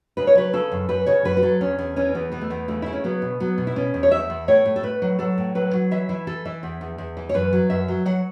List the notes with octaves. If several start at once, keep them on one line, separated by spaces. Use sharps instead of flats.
C#3 B4
C#5
F#3 B4
C#3 A4
F#2
F#2 B4
C#3 C#5
F#2 B4
F#4
F#3 A4
E2 C#4
E2 C#4
E3 C#4
E2 B3
E3 B3
A3
E2 B3
C#3 A3
C#3 E4
C#4
F#3 B3
B2
F#3 B3
B2
E4
B2 C#4
E2
C#5
E2 E5
E2
A2 C#5
A2
A4
A2 B4
F#3
F#3 A4
A2
F#3 B4
F#3
E3 E5
E3 E4
E3 A4
E3 E5
E2
E2
E2
E3
C#5
F#2 B4
F#3
F#2 E5
F#3
F#3 F#5